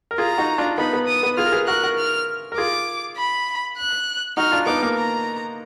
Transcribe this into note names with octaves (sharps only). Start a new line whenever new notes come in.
A#4
F4 G#4 A#5
D#4 F#4
D4 F4
B3 D#4 B5
B3
D#6
B3
F4 G#4 F6
A#4
G#4 B4
F#4 A#4 F#6
F#4 A#4
F6
A#4
F4 G#4 D6
B5
F#6
D#4 F#4 F6
D4 F4
B3 D#4 D6
A#3
A#5